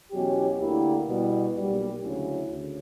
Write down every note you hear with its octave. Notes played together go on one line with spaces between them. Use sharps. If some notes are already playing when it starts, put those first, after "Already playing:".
E2 B2 F#3 C#4 G4
D2 D3 A#3 E4 G4
B2 G3 B3 E4
B1 A#2 G3
D2 C#3 F#3 C#4 E4
D2 C#3